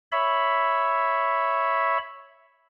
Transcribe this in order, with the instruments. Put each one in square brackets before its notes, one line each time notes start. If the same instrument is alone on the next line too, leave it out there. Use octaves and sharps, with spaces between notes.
[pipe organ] C#5 E5 B5